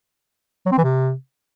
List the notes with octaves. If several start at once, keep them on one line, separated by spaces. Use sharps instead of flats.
F#3
C4
E3
C3